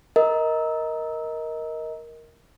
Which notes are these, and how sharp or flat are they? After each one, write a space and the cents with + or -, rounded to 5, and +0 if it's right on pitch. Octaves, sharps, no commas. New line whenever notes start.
A#4 +5 D#5 +20